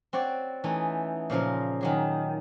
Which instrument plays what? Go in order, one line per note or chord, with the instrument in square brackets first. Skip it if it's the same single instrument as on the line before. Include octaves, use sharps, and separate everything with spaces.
[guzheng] C4 F#4 C#5 D5
E3 A3 C#4 D#4
A#2 C#3 F3 A#4
D#3 F#3 G#4